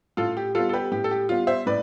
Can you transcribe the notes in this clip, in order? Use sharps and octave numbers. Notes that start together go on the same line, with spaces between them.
A2 F4 A4
G4
G3 B3 F4 A4
A4
G4 B4
A2 G4
A4
G4
G3 B3 F4
C5 E5
A2 B4 D5